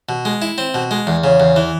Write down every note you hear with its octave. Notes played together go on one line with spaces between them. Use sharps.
B2
G#3
E4
C4
B2
G#3
E2
C#3
E2
E3